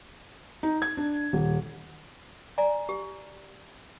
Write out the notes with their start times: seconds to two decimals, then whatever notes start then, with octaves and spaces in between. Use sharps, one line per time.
0.63 D#4
0.82 G#6
0.97 D4
1.33 D#1
2.58 D5 G#5 A#5
2.89 G4